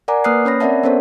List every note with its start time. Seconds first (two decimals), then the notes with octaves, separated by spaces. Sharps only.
0.08 A#4 D5 F#5 G#5 A#5 D6
0.24 A#3 B4 D#6 F6 F#6 C7
0.45 C#4 C#5 B5 A#6
0.60 C4 A#4 D5 E5 F#5 A5
0.83 B3 C#4 A4 A#4 C5 C#5